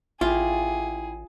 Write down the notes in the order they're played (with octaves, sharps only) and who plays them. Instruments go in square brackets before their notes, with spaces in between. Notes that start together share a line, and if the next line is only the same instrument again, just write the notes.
[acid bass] A1 [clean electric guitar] E4 G4 [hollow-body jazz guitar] F4 [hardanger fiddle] G#4